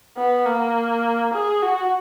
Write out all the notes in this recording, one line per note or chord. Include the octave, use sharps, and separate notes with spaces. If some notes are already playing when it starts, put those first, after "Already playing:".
B3
A#3
G#4
F#4